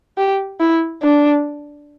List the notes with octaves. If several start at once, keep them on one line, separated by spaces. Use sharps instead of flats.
G4
E4
D4